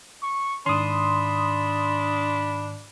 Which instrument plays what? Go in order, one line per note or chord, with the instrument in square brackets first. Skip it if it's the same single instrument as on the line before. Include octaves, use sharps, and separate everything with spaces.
[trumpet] C#6
[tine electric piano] G#2 D#3 [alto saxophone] D4 [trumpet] B5 [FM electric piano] C6 D#6